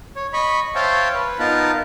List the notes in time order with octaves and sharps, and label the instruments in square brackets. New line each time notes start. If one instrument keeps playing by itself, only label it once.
[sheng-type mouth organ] C#5
D#5 B5 C#6
C5 C#5 E5 F5 G5 A5
B4
B3 D#4 F4 A#4 A5